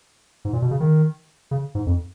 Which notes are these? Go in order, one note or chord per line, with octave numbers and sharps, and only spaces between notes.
G#2
A#2
B2
C#3
D#3
C#3
G#2
F2